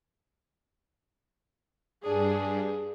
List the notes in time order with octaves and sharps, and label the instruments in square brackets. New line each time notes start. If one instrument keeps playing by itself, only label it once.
[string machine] G2 [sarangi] D4 [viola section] G#4